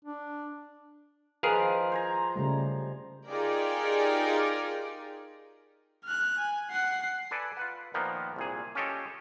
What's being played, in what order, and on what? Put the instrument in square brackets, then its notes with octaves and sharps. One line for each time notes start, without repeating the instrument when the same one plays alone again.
[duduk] D4
[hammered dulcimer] D#3 F3 [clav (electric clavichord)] G#4 A#4 F5 [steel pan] B4
[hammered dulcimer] C5 G#5 A#5
[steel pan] C#3 G3 A3
[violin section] D#4 F4 G4 G#4 A#4 D5
[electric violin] F6 F#6
G#5
F#5 C7
[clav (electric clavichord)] A4 B4 D5 G#5
F4 B4 F#5
A#2 D#3 F3 A#3 B3
C2 A#2 G#4
C#4 F4 G4 A4 C#5 D#5